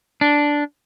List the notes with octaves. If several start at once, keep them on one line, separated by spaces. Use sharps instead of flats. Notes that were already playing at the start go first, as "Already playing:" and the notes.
D4